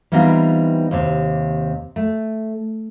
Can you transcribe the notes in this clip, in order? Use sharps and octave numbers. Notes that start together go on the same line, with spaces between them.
E3 G3 B3 C4 D#4 F4
D#2 C3
A3